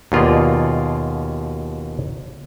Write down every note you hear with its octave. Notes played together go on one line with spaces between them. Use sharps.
D#2 B2 F4 G#4 D5